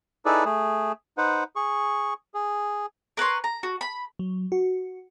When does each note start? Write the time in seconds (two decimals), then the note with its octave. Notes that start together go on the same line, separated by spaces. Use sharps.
0.25 D#4 E4 G#4 A4 B4 D5
0.45 A3 G#4
1.18 D#4 B4 C5 F#5
1.56 G#4 C#6
2.34 G#4
3.17 A#4 B4 C#5 C6
3.44 A#5
3.63 F#4
3.81 B5
4.19 F#3
4.52 F#4